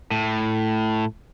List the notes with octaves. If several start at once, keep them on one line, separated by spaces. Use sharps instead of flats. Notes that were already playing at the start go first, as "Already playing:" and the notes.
A2